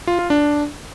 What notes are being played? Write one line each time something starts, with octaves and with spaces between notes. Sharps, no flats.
F4
F4
D4